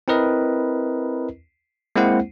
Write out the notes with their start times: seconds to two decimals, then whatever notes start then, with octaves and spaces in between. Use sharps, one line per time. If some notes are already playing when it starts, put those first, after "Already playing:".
0.08 C4 E4 A#4 B4 D#5
1.96 G#3 A#3 C4 E4 C5 F#5